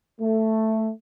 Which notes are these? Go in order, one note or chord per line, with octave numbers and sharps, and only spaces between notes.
A3